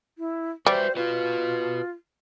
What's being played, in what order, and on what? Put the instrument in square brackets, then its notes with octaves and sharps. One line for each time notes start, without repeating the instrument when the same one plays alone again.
[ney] E4
[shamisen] G3 [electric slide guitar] F#4 B4 E5 [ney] C5
[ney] F4 [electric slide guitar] F#4 B4